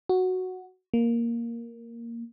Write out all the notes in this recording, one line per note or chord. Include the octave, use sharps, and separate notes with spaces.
F#4
A#3